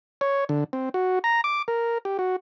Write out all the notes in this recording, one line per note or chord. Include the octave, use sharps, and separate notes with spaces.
C#5
D3
C4
F#4
A#5
D6
A#4
G4
F#4